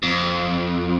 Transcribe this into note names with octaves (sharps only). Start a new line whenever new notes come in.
F2